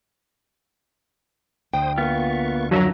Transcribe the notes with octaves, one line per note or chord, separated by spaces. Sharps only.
D2 C5 G5 D#6
A#3 B3 F4 C#6
F#2 D#3 F3 F#3 D4 E5 A#5